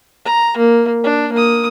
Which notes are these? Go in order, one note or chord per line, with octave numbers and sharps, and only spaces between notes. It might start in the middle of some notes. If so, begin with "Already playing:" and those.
A#5
A#3
D4
A#3 D#6